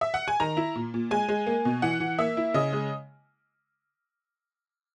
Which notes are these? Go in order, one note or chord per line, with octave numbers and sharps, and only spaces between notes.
E5
F#5
G#5
D#3 A#5
E4
A#2
A#2
G#3 G#5
G#3
A#3
B2
E3 F#5
E3
A#3 E5
E4
C#3 D#5
G#3